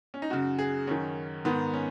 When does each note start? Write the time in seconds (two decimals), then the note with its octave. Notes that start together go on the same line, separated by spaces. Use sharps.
0.14 C#4
0.22 D#4
0.30 F#2 C#3 F#4
0.59 G#4
0.87 F#2 D#3 C#4
1.45 G#2 D#3 B3
1.74 C#4